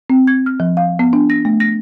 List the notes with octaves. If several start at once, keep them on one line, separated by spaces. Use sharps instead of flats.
C4
G#6
F6
F3
F5
B3
D4
A#6
A3
A#6